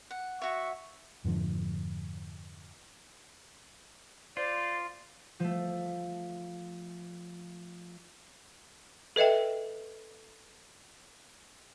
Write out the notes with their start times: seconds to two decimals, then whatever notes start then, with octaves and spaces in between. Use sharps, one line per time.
0.11 F#5
0.42 F#4 C#5 E5 F#5 C#6
1.24 F2 G#2 D3 F3
4.37 F4 C5 D5
5.40 F3 A3
9.16 A4 B4 D#5 E5 G5